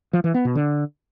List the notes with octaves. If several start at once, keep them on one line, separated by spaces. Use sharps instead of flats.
F3
E3
B3
B2
D3